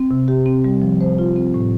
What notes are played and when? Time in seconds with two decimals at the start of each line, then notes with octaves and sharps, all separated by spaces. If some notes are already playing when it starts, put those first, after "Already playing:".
Already playing: C4
0.11 C3
0.28 G4
0.46 C4
0.64 G3
0.82 F3
1.01 C5
1.19 F4
1.36 C4
1.54 A2